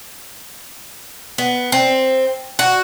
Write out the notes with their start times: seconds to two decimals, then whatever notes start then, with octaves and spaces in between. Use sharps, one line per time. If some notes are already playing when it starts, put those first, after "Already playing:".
1.38 B3
1.72 C4
2.59 F#4